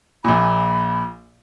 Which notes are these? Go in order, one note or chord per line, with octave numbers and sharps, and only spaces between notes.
A#1 A#2 B5